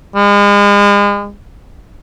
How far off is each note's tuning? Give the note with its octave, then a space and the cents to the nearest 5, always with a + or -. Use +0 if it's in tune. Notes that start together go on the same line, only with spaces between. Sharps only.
G#3 -40